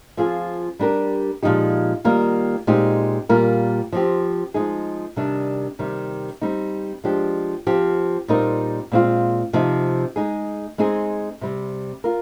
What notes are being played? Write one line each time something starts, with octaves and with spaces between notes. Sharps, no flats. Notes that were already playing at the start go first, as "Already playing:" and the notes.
F3 C4 F4 G#4
G3 D4 G4 A#4
A#2 F3 G#3 D#4 G4
D#3 G3 A#3 F4
A#2 G#3 C4 D#4 G4
A#2 G3 A#3 F4 A#4
F3 C4 G4
F3 G#3 D#4 G#4
C3 D#3 G3 D4
C3 D#3 G3
G3 C4 D#4
F3 G#3 D4 G4
F3 C4 G4
A#2 G3 C4 D#4 A#4
A#2 G#3 C4 F4
C3 F3 C4 D#4
G#3 D#4 G#4
G#3 C4 D#4 G#4
C3 G3 C4
F4 A#4